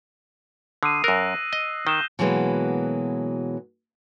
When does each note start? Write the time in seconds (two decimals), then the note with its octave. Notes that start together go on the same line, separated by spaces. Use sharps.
0.83 D3 D#6 C7 D#7
1.04 F#2 A#4 E6 F#6 A#6
1.53 D#5
1.87 D#3 G6 E7 G7
2.19 B2 E3 F#3 G#3 A#3 B4